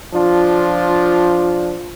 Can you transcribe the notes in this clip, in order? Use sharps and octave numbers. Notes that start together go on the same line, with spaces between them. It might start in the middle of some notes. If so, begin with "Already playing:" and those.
F3 D4 F4